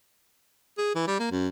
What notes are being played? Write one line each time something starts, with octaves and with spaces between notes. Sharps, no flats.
G#4
E3
G3
A#3
F#2